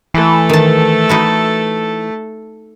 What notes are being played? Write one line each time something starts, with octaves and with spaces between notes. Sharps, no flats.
E3 A3 A4
D#3 A5
D#4 E4 F#4